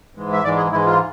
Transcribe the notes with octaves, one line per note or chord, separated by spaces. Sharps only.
G#2 E3 G#3
E5
G#2 E3 G#3 D5
G#4
G#2 E3 G#3 E4
F4